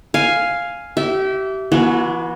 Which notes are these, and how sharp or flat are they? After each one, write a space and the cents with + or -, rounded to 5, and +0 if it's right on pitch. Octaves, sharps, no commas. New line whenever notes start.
F5 +0 G#5 +0
G4 -30 E5 +0
E3 +30 B3 -35 F#4 +0